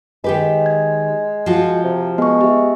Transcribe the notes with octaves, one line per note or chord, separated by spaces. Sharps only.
D#3 G#3 G4 B4
G#6
F3 F4 F#4
C3
G#3 B3 C#6
G4 E5